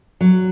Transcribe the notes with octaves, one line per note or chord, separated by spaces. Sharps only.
F#3